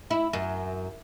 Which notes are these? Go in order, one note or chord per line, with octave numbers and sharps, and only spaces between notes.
E4
F#2